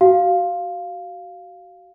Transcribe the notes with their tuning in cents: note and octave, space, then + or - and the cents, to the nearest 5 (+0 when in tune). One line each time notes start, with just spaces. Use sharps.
F#4 +25 F5 +0